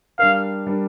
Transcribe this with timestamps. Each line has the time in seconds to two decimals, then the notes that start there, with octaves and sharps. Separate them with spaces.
0.19 G3 D4 A#4 F5
0.66 G3 D4 A#4